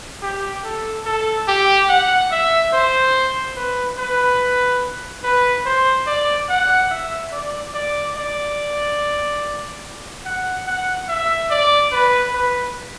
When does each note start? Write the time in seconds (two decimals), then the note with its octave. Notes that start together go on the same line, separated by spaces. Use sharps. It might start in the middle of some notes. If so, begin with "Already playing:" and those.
0.22 G4
0.64 A4
1.06 A4
1.48 G4
1.89 F#5
2.31 E5
2.73 C5
3.56 B4
3.98 B4
5.24 B4
5.66 C5
6.07 D5
6.49 F#5
6.91 E5
7.32 D5
7.74 D5
8.16 D5
10.25 F#5
10.67 F#5
11.09 E5
11.50 D5
11.92 B4
12.34 B4